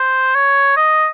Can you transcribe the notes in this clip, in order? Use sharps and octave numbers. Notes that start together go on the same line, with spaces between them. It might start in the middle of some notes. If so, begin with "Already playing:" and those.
Already playing: C5
C#5
D#5